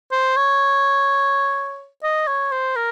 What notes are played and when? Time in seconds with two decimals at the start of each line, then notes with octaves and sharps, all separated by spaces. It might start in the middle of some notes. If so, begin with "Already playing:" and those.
0.11 C5
0.36 C#5
2.03 D#5
2.27 C#5
2.51 C5
2.76 A#4